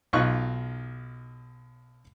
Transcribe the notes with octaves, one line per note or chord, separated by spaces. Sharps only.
B1 D#4 F4 C#6 F#6